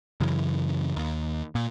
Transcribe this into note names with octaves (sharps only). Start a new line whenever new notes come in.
F#2 C#3 E3
D#2
A#2